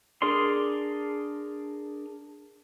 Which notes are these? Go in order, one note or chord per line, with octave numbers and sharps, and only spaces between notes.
D4 G#4 A#4 D5 C6